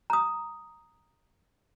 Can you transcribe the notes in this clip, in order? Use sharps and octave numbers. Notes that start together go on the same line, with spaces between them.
A#5 D#6